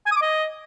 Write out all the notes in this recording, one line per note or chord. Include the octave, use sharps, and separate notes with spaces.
G#5
D#6
D6
D#5